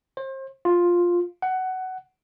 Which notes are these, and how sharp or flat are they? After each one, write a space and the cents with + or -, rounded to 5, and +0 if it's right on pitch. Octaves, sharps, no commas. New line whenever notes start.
C5 +35
F4 +5
F#5 +15